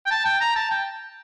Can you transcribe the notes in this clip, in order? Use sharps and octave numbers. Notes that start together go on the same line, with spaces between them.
G5
A5
G5
A#5
A5
G5